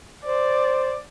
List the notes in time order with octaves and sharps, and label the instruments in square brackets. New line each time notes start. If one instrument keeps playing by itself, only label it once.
[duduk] C5 [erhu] D5